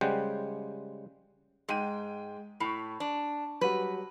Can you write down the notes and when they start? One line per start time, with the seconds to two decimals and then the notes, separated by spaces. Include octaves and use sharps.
0.01 C#3 G3 G#3 C5 F#5 G5
1.69 G#2 G#3 G5 D#7
2.60 A2 B5 C#6
3.00 D4
3.61 F#3 G3 F#4 B4